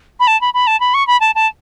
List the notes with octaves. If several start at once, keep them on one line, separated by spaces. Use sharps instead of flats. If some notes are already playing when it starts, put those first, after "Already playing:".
B5
A5
B5
B5
A5
B5
C#6
B5
A5
A5